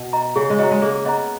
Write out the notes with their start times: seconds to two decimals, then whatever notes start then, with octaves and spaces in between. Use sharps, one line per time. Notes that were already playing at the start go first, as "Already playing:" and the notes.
Already playing: B2
0.13 D#5 A#5
0.36 C#3 G#4
0.50 G#3
0.59 F#3 D#5 A#5
0.71 G#3
0.82 A#3 G#4
1.05 B3 D#5 A#5